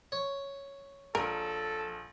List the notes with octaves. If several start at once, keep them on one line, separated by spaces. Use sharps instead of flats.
C#5
A#1 A4 A#4